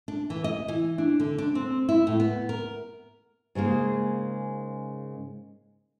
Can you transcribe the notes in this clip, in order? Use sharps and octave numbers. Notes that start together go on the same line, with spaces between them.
D4
E3
D#5
E3
D4
D3
D4
C4
E4
A2
B3
A#4
G#2 C#3 G#3 A#3